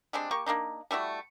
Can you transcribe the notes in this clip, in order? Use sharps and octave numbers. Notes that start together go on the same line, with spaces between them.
G3 G#3 C4 D4
A#3 G4 C#6
A#3 C4 D4 D#4
G3 A3 E4 F#4